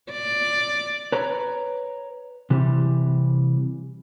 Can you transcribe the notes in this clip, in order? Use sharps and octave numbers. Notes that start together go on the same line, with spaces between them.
D5
B4 C#5 A#5
C3 E3 G3